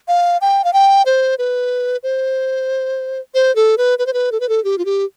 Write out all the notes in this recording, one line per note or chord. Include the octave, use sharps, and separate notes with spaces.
F5
G5
F5
G5
C5
B4
C5
C5
A4
B4
B4
C5
B4
A4
B4
A4
G4
F4
G4